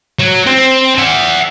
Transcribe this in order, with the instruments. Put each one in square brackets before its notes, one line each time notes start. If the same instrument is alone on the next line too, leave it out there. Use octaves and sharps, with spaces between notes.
[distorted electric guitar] F#3
C4
E5 F#5